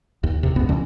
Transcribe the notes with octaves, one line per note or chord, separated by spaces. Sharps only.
D#2
E2 C3
C#2 G2 B3 C#4
B2 D3 E3 C#4